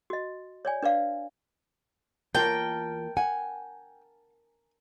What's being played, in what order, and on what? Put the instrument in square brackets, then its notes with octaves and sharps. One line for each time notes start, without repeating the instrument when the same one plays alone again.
[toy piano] F#4 D#5
C#5 D5 G#5
D4 B4 D5 F5
[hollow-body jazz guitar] E2 F4 C#5 [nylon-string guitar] A#3 [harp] A#4 A5 [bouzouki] G5
[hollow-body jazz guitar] F#5 [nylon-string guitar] G#5